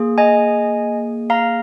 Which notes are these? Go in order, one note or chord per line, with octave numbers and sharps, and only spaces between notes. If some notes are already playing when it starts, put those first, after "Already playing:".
Already playing: A#3 G#4
D#5 G#5
F5 A#5